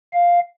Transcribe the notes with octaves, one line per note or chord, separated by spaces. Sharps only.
F5